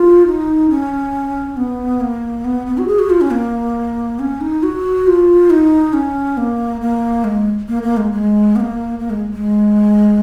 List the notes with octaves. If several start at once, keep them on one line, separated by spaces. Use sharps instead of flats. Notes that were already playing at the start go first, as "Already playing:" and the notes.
Already playing: F4
D#4
C#4
B3
A#3
B3
B3
F#4
G#4
F#4
F4
C#4
A#3
C#4
D#4
F#4
F4
D#4
C#4
A#3
A#3
G#3
A#3
A#3
G#3
G#3
B3
A#3
A#3
G#3
G#3